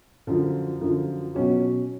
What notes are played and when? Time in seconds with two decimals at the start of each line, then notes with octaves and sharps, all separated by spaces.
0.27 F#2 D3 F3
0.81 F#2 D3 F3
1.34 B2 F#3 C#4 F#4